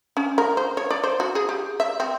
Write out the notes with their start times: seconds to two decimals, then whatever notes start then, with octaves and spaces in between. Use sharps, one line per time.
0.17 C#4
0.38 A#4
0.57 C5
0.77 C#5
0.90 D5
1.03 C5
1.20 F#4
1.35 G#4
1.49 G4
1.80 E5
2.00 C4